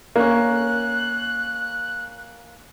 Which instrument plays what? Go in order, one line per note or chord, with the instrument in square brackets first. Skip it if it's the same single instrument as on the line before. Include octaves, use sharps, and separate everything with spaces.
[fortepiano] A#3 C#4 [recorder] F#6